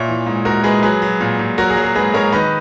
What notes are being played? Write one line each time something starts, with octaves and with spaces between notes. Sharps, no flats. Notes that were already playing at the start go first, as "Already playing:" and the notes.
Already playing: A#2 C#5 E5
E3
G#2
G#2 F#4 A#4
G#3 G#4 B4
F#3 G#4 B4
F#3
A#2
A#2
F#3 F#4 A#4
G#4
F#3
G#4
G#2 G#4 B4
G#2 A#4 C#5
D#3 B4 D#5